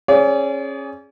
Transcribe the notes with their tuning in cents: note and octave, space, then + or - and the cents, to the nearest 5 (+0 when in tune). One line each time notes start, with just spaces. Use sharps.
C#4 -25 G#4 +0 D5 -40